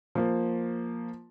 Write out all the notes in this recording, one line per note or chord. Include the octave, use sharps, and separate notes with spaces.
F3 A#3